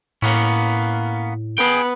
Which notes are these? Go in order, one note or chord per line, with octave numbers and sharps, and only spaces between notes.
A2 A#3 B3 C#4
B3 G#4 G5